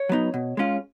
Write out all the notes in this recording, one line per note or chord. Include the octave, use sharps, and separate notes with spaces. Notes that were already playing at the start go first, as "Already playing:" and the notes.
Already playing: C#5
F#3 B3 D#4
B2
G#3 C#4 F4